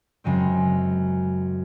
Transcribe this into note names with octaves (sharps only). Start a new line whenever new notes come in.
F#2 C#3 G#3 C4